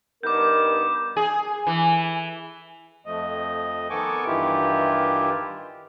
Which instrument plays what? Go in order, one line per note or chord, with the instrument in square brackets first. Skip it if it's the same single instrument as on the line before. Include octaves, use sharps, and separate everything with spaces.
[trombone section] G2 B3 D#4 [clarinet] A#4 [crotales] D6 G6
[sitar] G#4
E3
[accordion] F2 F3 A3 D#5
D#3 B3 A4 G#5 C#6 D6
G2 D#3 E3 E4 F4 G4